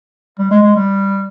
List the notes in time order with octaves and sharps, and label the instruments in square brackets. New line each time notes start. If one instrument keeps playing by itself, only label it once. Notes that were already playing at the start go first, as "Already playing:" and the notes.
[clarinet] G3
G#3
G#3
G3